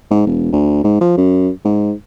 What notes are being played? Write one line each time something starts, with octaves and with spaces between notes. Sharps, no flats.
G#2
E1
D2
G#2
F3
F#2
G#2